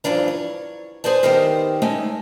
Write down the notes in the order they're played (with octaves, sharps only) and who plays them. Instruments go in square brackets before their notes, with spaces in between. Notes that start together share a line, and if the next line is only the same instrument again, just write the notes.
[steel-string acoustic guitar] G2 B2 E3 F3 D4 A#5
C#5
G#4 B4 C5 D5 A5
D#3 B3 D#4 G4 A#4 C5
G#3 A3 C#4 D#4 C#5